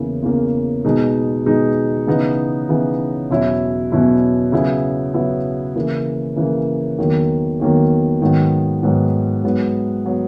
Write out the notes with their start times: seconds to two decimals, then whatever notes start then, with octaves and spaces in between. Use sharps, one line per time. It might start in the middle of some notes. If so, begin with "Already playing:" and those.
Already playing: E2 C#3 E3 A#3
0.22 E2 C#3 E3 A#3
0.84 B2 G#3 D#4
1.46 B2 G#3 D#4
2.07 C#3 E3 B3 D#4
2.69 C#3 E3 B3 D#4
3.30 E2 B2 F#3 C#4 E4
3.92 E2 B2 F#3 C#4 E4
4.52 C#3 F#3 B3 E4
5.14 C#3 F#3 B3 E4
5.76 C#3 E3 A#3
6.36 C#3 E3 A#3
6.98 E2 D#3 F#3 A#3
7.60 E2 D#3 F#3 A#3
8.21 G#2 D#3 F#3 B3
8.83 G#2 D#3 F#3 B3
9.44 G#2 F#3 B3
10.06 F#3 B3